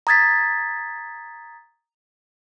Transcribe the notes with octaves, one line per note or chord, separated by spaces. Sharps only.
A#5 D#6 G#6 A6 B6